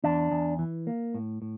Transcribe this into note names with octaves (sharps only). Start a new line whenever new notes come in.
E2 D4
E2
E3
A#3
A2
A2